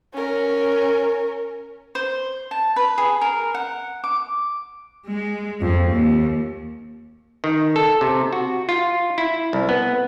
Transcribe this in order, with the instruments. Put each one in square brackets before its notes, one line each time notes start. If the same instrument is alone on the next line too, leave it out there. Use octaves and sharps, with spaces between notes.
[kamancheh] C#4 A#4
[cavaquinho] C5
A5
B4
G#4
A#4
F#5
D6
[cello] G#3
F2
D#2
[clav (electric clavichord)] D#3
A4
C3
F#4
F4
E4
C2
B3